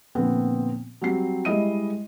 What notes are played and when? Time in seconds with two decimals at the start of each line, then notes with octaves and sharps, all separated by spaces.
0.15 A#2 D3 F3 B3 C4
1.02 F#3 G3 C4 C7
1.45 G3 G#3 E4 D#5 D#6 D#7